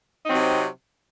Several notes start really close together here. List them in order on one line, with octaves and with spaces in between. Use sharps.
D#4 C4 F#3 C3